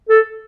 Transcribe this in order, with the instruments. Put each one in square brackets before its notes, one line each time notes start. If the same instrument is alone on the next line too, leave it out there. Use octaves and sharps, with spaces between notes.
[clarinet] A4